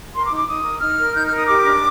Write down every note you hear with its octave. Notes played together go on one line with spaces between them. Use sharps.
A#4 C6
D6
D#4
D6
D#4 D#6
A#4
D#4 F6
A#4
D#4 G6
F6
A#4
D#6
G4 D6
D4